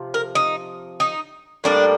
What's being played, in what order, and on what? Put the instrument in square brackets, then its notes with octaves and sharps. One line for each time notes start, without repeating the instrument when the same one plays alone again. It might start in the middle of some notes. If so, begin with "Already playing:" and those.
Already playing: [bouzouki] C3 F3
A#4
D#4
D#4
A2 G3 A#3 D4